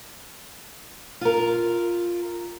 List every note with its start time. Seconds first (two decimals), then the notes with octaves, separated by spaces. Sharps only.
1.21 F4 A#4